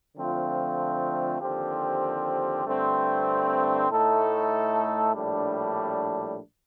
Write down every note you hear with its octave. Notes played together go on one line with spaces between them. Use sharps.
D3 F3 A3 C4 F4
D#2 D3 F3 C4 G4
G2 D3 A3 C4
A2 A3 D#4 A4
A#1 A2 G3 D4